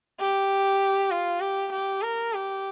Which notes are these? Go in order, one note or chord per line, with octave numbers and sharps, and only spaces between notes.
G4
F4
G4
G4
A#4
G4